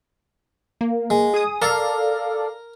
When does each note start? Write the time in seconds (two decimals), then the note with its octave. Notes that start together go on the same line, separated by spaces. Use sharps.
0.81 A#3
1.10 G#3
1.34 G#4 D#6
1.62 A4 A#4 D5 F5 A#5